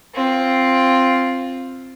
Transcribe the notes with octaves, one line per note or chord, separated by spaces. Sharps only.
C4 F4